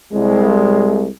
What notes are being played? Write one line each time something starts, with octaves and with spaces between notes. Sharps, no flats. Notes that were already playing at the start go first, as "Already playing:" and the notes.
C2 G#3